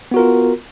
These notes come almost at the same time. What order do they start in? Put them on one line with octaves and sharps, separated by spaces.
B3 F#4 A#4 F4